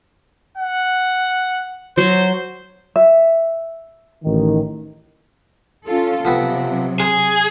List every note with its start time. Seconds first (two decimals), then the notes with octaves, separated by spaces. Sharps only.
0.58 F#5
1.97 F#3 C5
2.96 E5
4.25 A1 D#3
5.85 C#4 F4 A4
6.25 C3 F3 F#3 B3 C4
7.00 G#4 C6